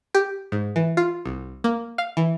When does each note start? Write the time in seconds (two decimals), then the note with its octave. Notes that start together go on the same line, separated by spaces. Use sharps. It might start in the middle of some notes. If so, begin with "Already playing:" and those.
0.15 G4
0.52 G#2
0.76 E3
0.97 F4
1.25 C2
1.64 A#3
1.98 F5
2.17 E3